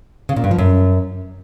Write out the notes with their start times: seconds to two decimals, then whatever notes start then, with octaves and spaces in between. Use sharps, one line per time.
0.29 C#3
0.36 A#2
0.44 G2
0.51 F3
0.58 F#2